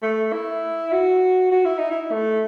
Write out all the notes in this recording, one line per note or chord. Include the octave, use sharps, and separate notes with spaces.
A3
E4
F#4
F#4
E4
D#4
E4
A3